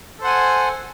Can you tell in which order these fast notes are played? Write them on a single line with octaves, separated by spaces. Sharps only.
A4 C5 F#5 G#5